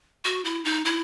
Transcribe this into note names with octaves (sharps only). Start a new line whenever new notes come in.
F#4
E4
D#4
E4